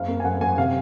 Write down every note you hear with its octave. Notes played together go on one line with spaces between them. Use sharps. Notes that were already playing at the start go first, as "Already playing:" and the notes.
Already playing: F#1 F5
A#3
G#5
F#2 F#5
F#2 G#5
C3 F5